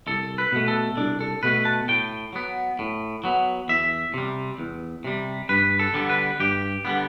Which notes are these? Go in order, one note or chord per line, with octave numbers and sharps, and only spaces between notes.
C2 A4
B4
B2 A3
A4
C2 D4
A4
B2 A3 B4
A5
A2 G5
F#3 B3
A2
F#3 B3
E2 E5
C3 G3
E2
C3 G3
G2 B4
A4
D3 G3 B3
B4
G2 G4
D3 G3 B3